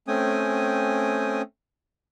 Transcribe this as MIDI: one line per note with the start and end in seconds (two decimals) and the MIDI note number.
0.08 1.42 57
0.08 1.42 60
0.08 1.42 61
0.08 1.42 79
0.08 1.42 80
0.08 1.42 87